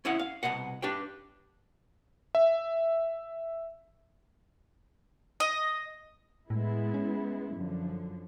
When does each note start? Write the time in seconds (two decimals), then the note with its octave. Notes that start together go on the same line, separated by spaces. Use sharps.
0.05 C#4 E4 D#5 F#5
0.19 F5
0.43 C2 B2 D#5 F#5
0.82 D4 G4 B4 G5
2.35 E5
5.40 D#5
6.50 A2 G#3 B3 E4
6.94 C#4
7.54 F#2 D3 F3